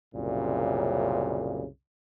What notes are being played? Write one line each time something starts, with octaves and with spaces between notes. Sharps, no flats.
C2 F#2 A#2 C#3